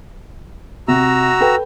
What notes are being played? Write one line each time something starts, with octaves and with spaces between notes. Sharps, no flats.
C3 F#4 A#5 E6
A4 B4 G5